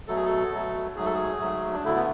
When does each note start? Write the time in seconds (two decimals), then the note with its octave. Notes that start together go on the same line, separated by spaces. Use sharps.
0.07 B2 F#3 A3 A4
0.16 G#4
0.25 A4
0.51 B2 F#3 A3
0.96 G#2 F#3 A3 G#4
1.05 A4
1.14 G#4
1.39 G#2 F#3 A3
1.72 D4
1.84 D2 D3 A3 E4
1.95 B3